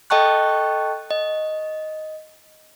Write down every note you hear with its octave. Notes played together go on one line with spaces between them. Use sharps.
A4 D#5 G5 A5 C#6 F#6
D#5